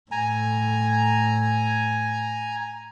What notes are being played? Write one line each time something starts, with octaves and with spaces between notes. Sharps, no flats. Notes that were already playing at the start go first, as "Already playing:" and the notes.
A2 G#5 A#5